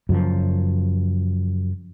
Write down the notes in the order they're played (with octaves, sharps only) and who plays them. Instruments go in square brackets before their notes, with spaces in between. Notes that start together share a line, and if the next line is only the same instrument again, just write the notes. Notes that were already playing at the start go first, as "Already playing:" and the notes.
[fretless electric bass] F#2 C#3 F3